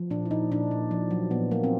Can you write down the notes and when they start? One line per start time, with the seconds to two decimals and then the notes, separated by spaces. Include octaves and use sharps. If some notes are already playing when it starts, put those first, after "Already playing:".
Already playing: F3
0.10 A#2 D4
0.25 E4
0.31 A#2 D#4
0.51 A#2 D4
0.71 A#2
0.91 F3
1.11 F#3
1.31 A#2 B3
1.51 F#3 A#3
1.64 C4